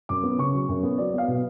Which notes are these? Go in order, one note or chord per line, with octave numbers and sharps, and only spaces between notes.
F#2 D6
B3
C#3 C#6
F#3
F#2
B3
F#3 D5
B3 F5
B2